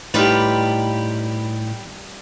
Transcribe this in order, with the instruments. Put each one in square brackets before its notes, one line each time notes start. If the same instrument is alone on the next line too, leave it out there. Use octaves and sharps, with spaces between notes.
[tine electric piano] A2 [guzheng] G3 D#4 F4 [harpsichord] G4 B4